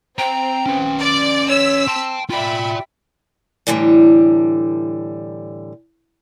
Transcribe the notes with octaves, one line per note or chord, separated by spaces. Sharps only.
C4 G5 A#5
C#4 B4
D5
C#5 E6 B6
G5 A5 C6
F4 D5 E5 G5 B5
A2 D3 E3 G3